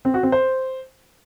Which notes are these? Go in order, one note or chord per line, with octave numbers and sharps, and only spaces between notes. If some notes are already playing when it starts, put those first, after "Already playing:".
C4
F#4
C4
C5